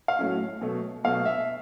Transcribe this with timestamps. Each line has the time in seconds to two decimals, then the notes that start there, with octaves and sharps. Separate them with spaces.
0.08 F5
0.19 A2 F#3 A3 C#4
0.61 B2 F#3 A3
1.04 B2 F#3 A3 F5
1.26 E5